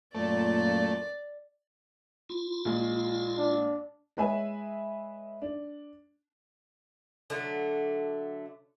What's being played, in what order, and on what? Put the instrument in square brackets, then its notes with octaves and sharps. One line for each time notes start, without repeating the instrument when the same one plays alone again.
[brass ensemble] F#2 A#2 [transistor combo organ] A3 [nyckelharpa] D5
[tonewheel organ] E4 F4
[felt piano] A#1 G#3
[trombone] D4
[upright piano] G#3 E4 B4 C#5 E5 G#5
D4
[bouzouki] D3 F#3 A3 D4